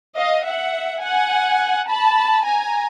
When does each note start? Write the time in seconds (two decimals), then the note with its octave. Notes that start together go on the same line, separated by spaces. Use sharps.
0.15 D#5 F5
0.44 E5 F#5
1.01 F#5 G#5
1.87 A5 B5
2.44 G#5 A#5